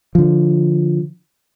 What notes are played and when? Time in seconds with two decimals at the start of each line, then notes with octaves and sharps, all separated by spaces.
0.15 D3 F3